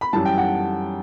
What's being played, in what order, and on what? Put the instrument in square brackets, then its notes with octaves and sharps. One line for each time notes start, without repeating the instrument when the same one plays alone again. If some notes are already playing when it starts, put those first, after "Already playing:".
[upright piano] B5
F#2 E3 G3 A5
G5
F#5